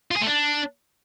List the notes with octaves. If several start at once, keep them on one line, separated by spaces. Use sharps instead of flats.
F4
G#4
A3
D4